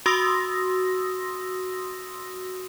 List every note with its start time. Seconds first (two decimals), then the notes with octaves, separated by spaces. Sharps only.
0.06 F#4 C6 D#6 E6 A#6